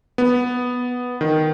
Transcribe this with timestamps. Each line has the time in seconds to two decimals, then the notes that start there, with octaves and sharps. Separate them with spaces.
0.18 B3
1.21 D#3